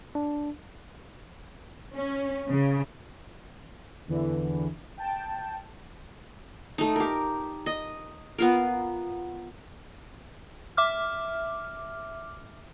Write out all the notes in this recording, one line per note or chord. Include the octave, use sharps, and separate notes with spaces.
D4
C#4
C#3
E2 D3 E3
G5 A5
A3 D#4
G4 A#4
D#5
B3 F4 A#4
E5 D6 F6